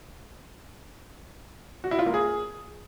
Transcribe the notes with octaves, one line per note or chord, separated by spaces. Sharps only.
F#4
E4
F4
A#3
G#4